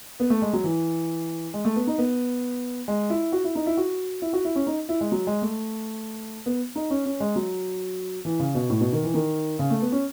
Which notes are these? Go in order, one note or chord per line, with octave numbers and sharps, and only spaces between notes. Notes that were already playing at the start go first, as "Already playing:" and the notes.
B3
A3
G#3
F#3
E3
G#3
A3
B3
D#4
B3
G#3
E4
F#4
E4
D#4
E4
F#4
E4
F#4
E4
C#4
D#4
E4
G#3
F#3
G#3
A3
B3
D#4
C#4
C#4
G#3
F#3
E3
C#3
B2
A2
B2
D#3
E3
D#3
C#3
A3
B3
C#4